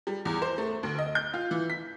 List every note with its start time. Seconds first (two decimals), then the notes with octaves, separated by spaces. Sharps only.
0.07 G3
0.25 E2
0.42 C5
0.58 A3
0.83 D2
0.98 D#5
1.15 G6
1.34 F4
1.51 E3
1.70 B6